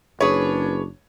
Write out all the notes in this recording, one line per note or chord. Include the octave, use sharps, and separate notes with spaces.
F#1 D4 G#4 B4 C#5